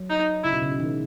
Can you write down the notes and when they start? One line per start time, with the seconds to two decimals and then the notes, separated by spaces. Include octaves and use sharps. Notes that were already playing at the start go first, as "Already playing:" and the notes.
Already playing: F#3
0.10 D#4
0.44 C#3 E4
0.53 B2
0.62 C#3
0.71 B2
0.80 D#3